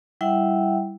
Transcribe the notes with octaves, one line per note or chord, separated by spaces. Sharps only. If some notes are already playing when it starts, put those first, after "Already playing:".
G3 E4 E5 F#5 G5